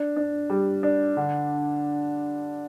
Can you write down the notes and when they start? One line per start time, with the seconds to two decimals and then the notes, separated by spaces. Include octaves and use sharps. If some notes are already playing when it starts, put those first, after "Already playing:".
Already playing: D4
0.17 D4
0.50 G3
0.83 D4
1.17 D3